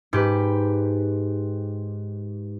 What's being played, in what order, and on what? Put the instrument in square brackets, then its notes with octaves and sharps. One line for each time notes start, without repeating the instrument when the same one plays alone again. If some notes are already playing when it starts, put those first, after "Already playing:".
[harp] G#2 G4 B4